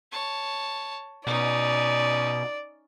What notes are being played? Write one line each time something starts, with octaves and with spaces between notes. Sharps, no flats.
C#5 A5
B2 C#4 D#4 D5